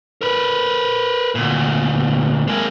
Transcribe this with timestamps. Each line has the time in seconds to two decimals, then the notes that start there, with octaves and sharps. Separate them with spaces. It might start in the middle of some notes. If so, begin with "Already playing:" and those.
0.21 A#4 B4
1.35 D2 A#2
2.48 G#3 A#3